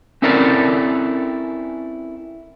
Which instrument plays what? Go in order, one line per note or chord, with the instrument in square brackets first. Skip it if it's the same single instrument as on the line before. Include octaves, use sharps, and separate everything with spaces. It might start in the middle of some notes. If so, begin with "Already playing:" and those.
[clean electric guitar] C4 C#4 E4 A4 A#4 D5